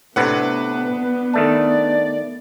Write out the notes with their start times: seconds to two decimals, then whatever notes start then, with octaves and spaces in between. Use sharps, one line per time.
0.16 A2 C3 B3 D4 B4 F#5
1.33 D#3 A3 D5 A5